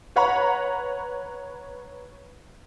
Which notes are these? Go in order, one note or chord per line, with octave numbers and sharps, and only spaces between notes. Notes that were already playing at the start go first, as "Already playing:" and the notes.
B4 C#5 F#5 A#5 B5 C#6